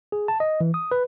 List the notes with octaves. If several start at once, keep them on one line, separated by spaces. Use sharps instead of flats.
G#4
A5
D#5
E3
D#6
B4